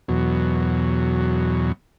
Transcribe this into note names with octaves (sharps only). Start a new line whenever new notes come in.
E2 B2 F#3